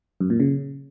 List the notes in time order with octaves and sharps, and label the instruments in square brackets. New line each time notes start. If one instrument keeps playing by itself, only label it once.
[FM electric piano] F#2
A#2
C#3